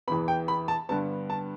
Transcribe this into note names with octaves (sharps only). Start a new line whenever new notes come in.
E2 E3 B3 B5
G5
B5
A5
G2 D3 G3 B3 A5
A5